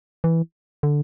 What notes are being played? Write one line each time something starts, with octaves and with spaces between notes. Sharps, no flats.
E3
D3